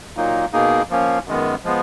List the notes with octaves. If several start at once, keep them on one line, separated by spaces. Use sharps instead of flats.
A#2 F#3 A#3 D#4
B2 A#3 D#4 G#4
F3 A#3 C#4
F#2 D#3 G#3 B3
F3 G#3 B3